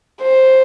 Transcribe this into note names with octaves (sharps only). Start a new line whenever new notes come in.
C5